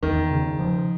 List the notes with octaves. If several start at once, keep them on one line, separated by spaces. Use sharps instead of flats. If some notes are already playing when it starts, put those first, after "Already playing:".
E2 D#3
C#3
F3